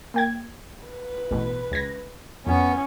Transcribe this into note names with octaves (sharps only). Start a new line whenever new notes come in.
A#3 G5 G#6
B4
A1 B2
C#2 G#6 A#6
F2 B3 C#4